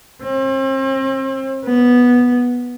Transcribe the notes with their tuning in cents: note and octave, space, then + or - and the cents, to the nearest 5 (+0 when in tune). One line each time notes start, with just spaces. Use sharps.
C4 +40
B3 -10